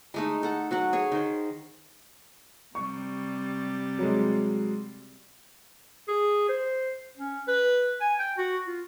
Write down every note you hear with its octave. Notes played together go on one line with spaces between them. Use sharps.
G#3 A3 D#4
A4 F#5
F#3 F#4 F#5
G#4 C#5
D#3 C5
C3 G3 C#6
F#3 G#3
G#4
C5
C#4
B4
G#5
G5
F#4
F4